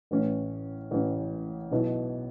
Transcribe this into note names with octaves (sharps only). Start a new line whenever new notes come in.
A1 A2 E3 C#4
A1 A2 E3 C#4
B1 B2 B3 E4